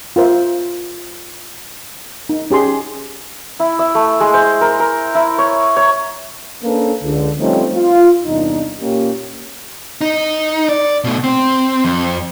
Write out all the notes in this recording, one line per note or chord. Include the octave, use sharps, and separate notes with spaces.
F4 A#4 C5 E5
D#4
C#4 G4 G#4 C6
E4
E5
A3
G#3
C5
A#4
A#4
E4
C#5
C#5
A#3 C#4 D4 A4 B4
C#2 D3
F3 G3 A3 C4 C#4 D#4
F4
E2 G2 C3 D4 D#4
A#2 A#3 C#4 G4
D#4
D5
B2 A3
C4
F2